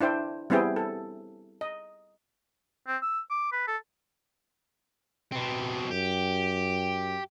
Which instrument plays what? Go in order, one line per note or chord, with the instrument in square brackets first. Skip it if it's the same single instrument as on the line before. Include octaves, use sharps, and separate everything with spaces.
[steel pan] D4 E4 C5 G5
G3 B3 C4 E4 G#4 G5
A4
D#5
[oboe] C4
E6
D6
B4
A4
[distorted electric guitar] B2 C4
[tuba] F#2 [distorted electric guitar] G4